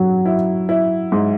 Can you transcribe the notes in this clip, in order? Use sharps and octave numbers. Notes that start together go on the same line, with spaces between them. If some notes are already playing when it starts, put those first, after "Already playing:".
Already playing: F#3 F#4
E4
E4
G#2